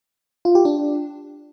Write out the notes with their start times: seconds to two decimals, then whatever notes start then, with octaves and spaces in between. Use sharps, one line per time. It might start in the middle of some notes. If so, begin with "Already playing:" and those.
0.45 F4
0.55 G4
0.65 D4